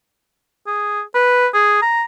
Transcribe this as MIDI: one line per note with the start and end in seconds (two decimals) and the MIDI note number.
0.67 1.01 68
1.14 1.47 71
1.53 1.79 68
1.82 2.04 82